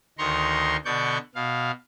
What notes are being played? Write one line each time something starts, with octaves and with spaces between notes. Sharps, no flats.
D2 D#3 A#5 C6 C#6
B2 D3 D5 C#6 G6
B2 F5